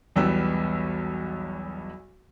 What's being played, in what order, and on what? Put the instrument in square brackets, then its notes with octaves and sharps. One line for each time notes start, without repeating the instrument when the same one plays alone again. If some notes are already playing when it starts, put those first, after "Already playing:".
[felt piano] B1 E2 G3 B3 E6